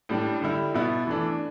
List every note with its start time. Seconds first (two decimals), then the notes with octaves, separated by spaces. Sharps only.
0.09 A2 G3 D4
0.42 D3 G3 E4
0.75 B2 B3 E4
1.07 E3 A3 D4